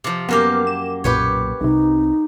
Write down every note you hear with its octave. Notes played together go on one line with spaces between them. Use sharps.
C3 F3
F#2 A#3 B3 G4 F6
E7
B1 F#2 A#2 G4 B4 C#5
C2 C3 D#4